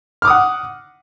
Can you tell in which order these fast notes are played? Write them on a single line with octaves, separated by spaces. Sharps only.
F6 D6 D#6 F#5